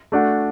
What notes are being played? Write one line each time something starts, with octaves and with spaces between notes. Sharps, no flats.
A3 D4 F#4